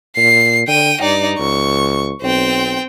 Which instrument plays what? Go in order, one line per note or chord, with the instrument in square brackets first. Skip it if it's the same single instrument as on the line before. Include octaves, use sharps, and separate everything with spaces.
[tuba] A#2 [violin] C7
[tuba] D3 [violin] G5 D#7
[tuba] G2 [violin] D#4 D5
[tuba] C#2 [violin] C#6
[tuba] B1 [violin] C4 G5